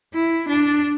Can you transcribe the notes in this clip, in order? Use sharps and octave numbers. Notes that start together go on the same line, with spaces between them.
E4
D4